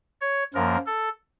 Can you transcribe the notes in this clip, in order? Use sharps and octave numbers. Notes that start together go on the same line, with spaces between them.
C#5
F#2 F3 A#3 A#4
A4